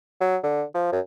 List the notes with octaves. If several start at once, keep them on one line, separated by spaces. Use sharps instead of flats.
F#3
D3
F3
F#2